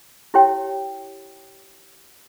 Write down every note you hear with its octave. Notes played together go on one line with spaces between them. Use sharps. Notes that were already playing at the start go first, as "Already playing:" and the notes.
E4 G4 C#5 G5